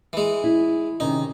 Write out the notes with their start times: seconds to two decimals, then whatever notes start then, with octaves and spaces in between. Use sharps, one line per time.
0.13 E3 G#3
0.44 E4
1.00 C3 D#3 C#4 D#4